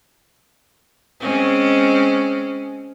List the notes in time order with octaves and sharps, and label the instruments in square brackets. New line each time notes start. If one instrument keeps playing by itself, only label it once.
[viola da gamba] G#3 C4 C#4